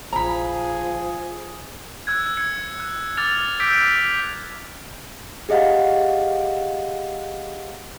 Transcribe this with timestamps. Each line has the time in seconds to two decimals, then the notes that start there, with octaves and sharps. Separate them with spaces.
0.12 A#1 F3 E4 G#4 A#5 B5
2.07 E6 F#6 G#6
2.37 G#6 C#7
2.80 F#6
3.17 D6 F6 A6 F7
3.60 D6 E6 G6 B6 D7
5.49 G4 G#4 D#5 F5 F#5